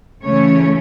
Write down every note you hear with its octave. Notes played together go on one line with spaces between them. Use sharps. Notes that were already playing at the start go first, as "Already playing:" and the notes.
C#3 E3 A3 C#4 C#5